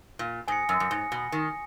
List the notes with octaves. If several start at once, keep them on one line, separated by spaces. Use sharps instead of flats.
A#2
G#2 G#5 D#6 A#6 C#7
F#2
F#2
G#2
B2
D#3